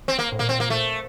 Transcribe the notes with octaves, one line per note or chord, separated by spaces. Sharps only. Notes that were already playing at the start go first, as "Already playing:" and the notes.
C4
A#3
A2
A#2 A#3
C4
A#3
A3